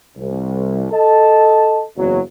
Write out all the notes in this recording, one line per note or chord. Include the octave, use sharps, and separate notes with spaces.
C2
A4 D#5 A5
F#1 E2 F#3